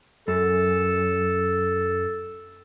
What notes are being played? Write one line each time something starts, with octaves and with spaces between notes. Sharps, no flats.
F#2 A4